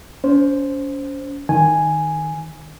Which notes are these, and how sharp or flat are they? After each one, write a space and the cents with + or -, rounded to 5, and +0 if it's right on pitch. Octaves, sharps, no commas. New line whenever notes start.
C#4 +35 C5 +0
D#3 +0 G#5 +0